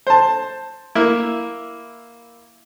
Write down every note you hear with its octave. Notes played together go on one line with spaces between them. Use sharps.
C5 A5
A#3 E4